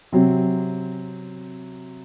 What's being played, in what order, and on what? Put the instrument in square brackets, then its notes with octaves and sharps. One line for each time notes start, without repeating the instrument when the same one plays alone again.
[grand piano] C3 F#3 C4